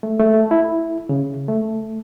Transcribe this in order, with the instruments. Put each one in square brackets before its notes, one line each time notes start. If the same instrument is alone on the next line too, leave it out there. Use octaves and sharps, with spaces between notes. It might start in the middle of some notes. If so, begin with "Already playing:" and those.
[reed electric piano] A3
A3
E4
C#3
A3